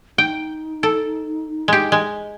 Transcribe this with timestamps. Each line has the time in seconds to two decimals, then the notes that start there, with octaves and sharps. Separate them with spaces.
0.18 D#4 G5
0.83 A4
1.68 G#3 G4
1.92 G#3